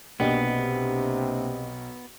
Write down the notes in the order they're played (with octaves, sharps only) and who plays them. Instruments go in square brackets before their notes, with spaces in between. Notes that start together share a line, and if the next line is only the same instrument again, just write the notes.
[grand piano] B1 D#5 G5 [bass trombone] C3 [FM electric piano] A#3 D4 G4 [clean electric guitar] B3